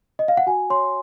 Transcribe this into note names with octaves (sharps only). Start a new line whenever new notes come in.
D#5
F5
F#5
F#4 G#5
C#5 C6